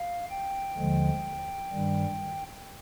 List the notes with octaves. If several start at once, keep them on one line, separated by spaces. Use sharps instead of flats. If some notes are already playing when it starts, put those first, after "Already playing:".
Already playing: F5
G5
D#2 D3 F3 G#3
G2 D#3 G3